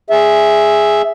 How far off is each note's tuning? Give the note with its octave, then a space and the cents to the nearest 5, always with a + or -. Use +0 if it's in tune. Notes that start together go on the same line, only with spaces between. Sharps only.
G#4 +0 E5 +0